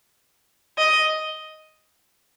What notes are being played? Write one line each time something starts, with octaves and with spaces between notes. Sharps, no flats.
D#5